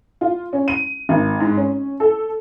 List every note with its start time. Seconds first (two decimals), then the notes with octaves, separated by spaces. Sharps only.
0.21 F4
0.53 C#4
0.68 D#7
1.09 G#1
1.40 G#2
1.57 C#4
2.00 A4